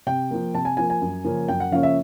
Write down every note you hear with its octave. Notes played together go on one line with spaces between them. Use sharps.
C3 G5
F3 A#3
C3 A5
G#5
F3 A#3 G#5
G#5
F#2
C#3 F3 A#3 C#4
F#2 G5
F#5
C#3 F3 A#3 C#4 F5
E5